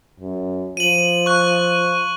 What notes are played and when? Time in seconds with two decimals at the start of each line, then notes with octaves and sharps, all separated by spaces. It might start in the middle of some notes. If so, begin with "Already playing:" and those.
0.20 F#2
0.77 F3 D#7 F#7
1.26 C#6 F#6